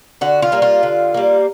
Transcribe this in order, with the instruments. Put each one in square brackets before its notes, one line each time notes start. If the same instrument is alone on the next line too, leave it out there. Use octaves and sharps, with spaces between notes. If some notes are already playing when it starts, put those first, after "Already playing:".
[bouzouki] D3 F#4
F4
G3 A#3
F4
D3
G3 A#3